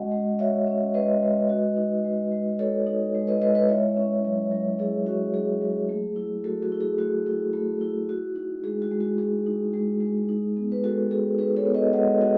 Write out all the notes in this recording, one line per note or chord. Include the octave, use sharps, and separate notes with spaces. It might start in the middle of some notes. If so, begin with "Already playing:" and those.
Already playing: G#3 C#4 F#4 D#5 F#5
G#3
F#4 C#5 E5
C#4
G#3 B4 D#5
G#3
F#4
D#4
G#3
G#3
F#4 A4 C#5
D#4
G#3
B4 D#5
G#3 B4 D#5
B4 D#5
E4 C#5 E5
C#4
F#3
F#3
E4 G#4
C#4 F#4
F#3 G#4
F#3
A3
E4
A3 F#4 A4
F#4
E4
G#4
A3 F#4
E4
A3
E4
F#4
D#4
G#3 G#4
F#4
G#3
F#4
F#4 G#4
D#4
G#3
G#3
D#4
B3
B4
G#3 F#4 A4
F#4 G#4
D#4 G#4 B4
A4 C#5
B3
B4 D#5
G#3 D#5 F#5
F#4 D#5 F#5